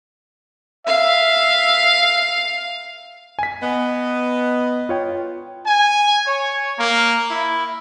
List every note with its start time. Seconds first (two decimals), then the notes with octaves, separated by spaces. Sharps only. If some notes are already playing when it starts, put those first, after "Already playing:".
0.87 E5 F5
3.39 G#5 B6
3.61 B3 D#5
4.89 F4 C#5 G5
5.66 G#5
6.25 C#5
6.78 A#3
7.30 E4